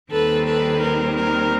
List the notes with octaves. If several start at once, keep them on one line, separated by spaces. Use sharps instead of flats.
D#2 D#3 G3 C4 A4 B4
A4 B4
A#4
A#4